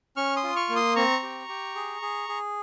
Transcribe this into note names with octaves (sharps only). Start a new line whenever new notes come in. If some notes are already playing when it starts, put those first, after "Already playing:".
C#4 C#6 F6
C6 D#6
F4
C#6 F6
A#3
C6 D#6
C4 A#5 C#6
G4
G4
G#4
G#4
G#4